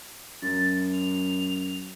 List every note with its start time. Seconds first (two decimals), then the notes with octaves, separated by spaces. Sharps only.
0.42 F#2 A6
0.92 F7